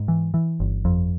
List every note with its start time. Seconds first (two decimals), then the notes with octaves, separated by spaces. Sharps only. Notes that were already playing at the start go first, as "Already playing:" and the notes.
Already playing: G#2
0.08 E3
0.34 E3
0.60 G1
0.85 F2